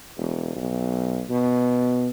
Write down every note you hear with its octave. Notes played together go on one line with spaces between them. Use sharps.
E1
B1
B2